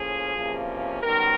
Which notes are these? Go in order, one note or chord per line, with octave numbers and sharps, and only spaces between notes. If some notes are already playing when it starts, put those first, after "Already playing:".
Already playing: A2 F3 A#3 C#4 G#4
E2 C3 F3 A#3 C#4
F#2 D#3 G3 B3 A#4